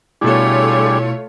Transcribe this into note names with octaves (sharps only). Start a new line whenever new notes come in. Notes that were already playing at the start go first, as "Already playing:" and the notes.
B2 G3 A3 D4 E4 F4 G#4 C#5